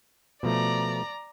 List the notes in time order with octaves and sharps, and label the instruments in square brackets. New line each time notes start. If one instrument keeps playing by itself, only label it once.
[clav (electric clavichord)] B2 F3 A3 [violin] D5 A#5